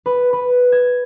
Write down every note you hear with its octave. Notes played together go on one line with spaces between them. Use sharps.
B4
B4
G#6